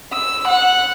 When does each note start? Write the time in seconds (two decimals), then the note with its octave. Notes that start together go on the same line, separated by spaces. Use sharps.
0.13 E6
0.48 F#5